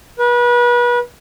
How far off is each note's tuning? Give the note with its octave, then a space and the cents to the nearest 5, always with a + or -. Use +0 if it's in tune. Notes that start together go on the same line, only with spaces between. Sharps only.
B4 -35